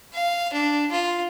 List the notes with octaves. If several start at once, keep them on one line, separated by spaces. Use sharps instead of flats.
F5
D4
F4